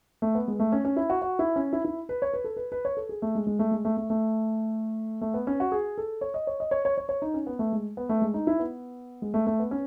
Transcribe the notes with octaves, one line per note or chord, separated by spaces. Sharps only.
A3
B3
G#3
A3
C#4
C#4
E4
F#4
F#4
E4
C#4
E4
E4
B4
C#5
B4
A4
B4
B4
C#5
A4
G#4
A3
G#3
G#3
A3
G#3
A3
A3
A3
A3
B3
C#4
F#4
G#4
A4
C#5
D#5
C#5
D#5
C#5
C#5
C#5
C#5
D#4
C#4
B3
A3
G#3
B3
A3
G#3
D#4
E4
B3
G#3
A3
A3
B3
C#4